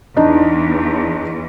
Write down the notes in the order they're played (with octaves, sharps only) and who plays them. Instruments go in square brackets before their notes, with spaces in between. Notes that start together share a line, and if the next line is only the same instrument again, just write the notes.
[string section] E2 [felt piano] D4 D#4